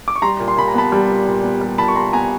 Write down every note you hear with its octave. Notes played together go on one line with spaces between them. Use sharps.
D6
C#6
G3 A#5 C6
A#2
C6
A#2 B5
A#5
B3 A5 B5
G3
A#2
A#2
B3
G3
A#2 A5 B5
C#6
A#2 A#5 C6
B3 G#5 A#5